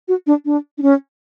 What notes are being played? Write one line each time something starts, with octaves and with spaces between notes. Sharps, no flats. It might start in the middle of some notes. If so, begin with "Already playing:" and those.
F#4
D4
D4
D4
C#4